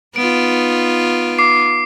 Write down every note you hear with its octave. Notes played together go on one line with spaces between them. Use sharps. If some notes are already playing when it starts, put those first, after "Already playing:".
B3 D#4 F4 D7
D6 C7